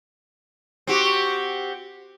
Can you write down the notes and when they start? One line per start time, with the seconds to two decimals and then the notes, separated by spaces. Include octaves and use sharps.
0.87 C4 F#4 G4